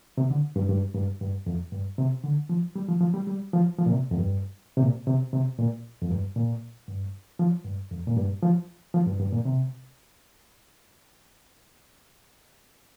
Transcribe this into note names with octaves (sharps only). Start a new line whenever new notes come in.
C3
D3
G2
G2
G2
G2
F2
G2
C3
D3
F3
G3
F3
F3
G3
G3
F3
F3
A#2
C3
F2
G2
C3
A#2
C3
C3
A#2
F2
G2
A#2
G2
F3
G2
F2
A#2
G2
F3
F3
G2
G2
A#2
C3